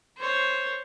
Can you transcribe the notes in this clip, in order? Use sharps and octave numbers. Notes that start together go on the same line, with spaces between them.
C5 C#5